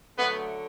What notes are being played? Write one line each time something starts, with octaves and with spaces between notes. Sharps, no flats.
D3 F#3 A3 B3 B4